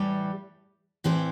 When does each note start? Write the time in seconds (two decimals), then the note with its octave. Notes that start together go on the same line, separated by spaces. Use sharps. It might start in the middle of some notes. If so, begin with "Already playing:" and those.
Already playing: A2 E3 G3
1.04 A2 E3 C4 E4 G4